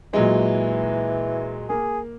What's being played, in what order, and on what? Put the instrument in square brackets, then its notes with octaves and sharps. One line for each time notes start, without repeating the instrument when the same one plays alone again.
[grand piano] A#2 F#3 G#3 [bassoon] E3
[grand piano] A#3 [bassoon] G#4